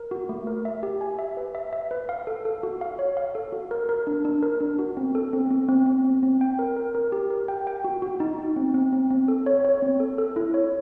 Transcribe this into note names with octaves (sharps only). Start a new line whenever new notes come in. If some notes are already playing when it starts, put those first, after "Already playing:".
Already playing: A#4
F#4
A3
A#4
E5
G4
G#5
E5
B4
E5
E5
B4
F5
A4
A4
F#4
F5
C#5
F5
A4
F#4
A#4
A#4
D4
D4
A#4
D4
F#4
C4
A4
C4
C4
C4
C4
C4
C4
G5
A#4
A#4
A#4
G4
A#4
G5
G5
F#4
F#4
D#4
D#4
C4
C4
C4
C4
A4
C#5
C#5
C4
A4
A4
E4
C#5